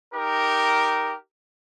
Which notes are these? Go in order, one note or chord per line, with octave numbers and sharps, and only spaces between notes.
D#4 G4 A#4